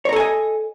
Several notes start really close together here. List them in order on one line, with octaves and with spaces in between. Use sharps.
C#5 A#5 A4 G#5 D#5